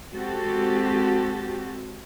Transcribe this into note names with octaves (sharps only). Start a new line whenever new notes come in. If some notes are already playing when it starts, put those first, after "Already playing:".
G#3 C4 F#4 G4 A4